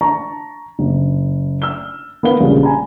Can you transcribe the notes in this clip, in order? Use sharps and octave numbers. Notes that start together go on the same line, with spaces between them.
A5 A#5 C#6
F#1
E6 F6 G7
B3 A#4 F5 G7
A#1 C#3 G3
G#5 A#5 B5